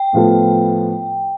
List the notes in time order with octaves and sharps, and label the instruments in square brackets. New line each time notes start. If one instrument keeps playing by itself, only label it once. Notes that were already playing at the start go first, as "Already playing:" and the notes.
Already playing: [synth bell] G5
[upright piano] A2 F3 B3 F4 A4